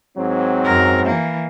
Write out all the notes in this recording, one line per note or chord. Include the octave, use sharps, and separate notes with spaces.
G#2 F#3 C4
F#2 A#4
E3 A#3